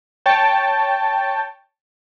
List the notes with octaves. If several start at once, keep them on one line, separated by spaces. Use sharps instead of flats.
C#5 G5 A5